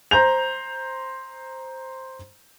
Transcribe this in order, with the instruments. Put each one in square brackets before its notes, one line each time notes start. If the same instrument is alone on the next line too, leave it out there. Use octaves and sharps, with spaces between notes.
[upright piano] C5 A#5 G6 F7